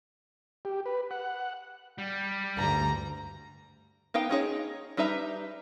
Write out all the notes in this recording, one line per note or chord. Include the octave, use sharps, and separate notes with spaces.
G4
B4
F#5
G3
D2 G2 A#5
B3 D#4 F5 G5
C#4 D#4 G#4 C#5
G3 D#4 B4 E5 A#5